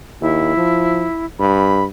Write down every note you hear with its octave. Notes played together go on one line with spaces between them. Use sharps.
D#2 E4
F3
G2 B5